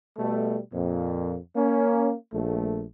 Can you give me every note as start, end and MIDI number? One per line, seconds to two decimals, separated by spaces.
0.18 0.59 47
0.18 0.59 55
0.18 0.59 57
0.73 1.37 41
0.73 1.37 46
1.56 2.12 58
1.56 2.12 61
2.33 2.84 34
2.33 2.84 57